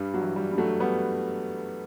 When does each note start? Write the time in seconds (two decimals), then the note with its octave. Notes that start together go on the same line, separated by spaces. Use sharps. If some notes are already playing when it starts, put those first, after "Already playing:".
Already playing: G2 G3
0.14 F#3
0.22 E3
0.36 G3
0.51 G2
0.58 F#3 A3
0.80 G3 B3